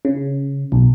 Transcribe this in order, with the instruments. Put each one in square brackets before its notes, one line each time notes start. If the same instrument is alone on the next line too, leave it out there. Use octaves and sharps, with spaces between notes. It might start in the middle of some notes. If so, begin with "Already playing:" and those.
[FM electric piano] C#3
B1